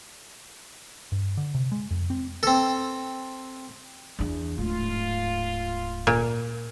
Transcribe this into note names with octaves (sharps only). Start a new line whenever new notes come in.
G2
D3
C3
G#3
F2
C4
C4 A4
E2 D4
D1 G#2 F4
A#2